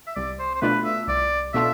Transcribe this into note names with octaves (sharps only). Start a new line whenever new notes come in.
E5
C2 D5
C5
C5
B2 A3 D4 F4 B4
E5
C2 D5
B2 A3 D4 F4 E5